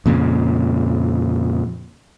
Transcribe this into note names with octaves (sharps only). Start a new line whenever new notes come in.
F2 A#2 C#3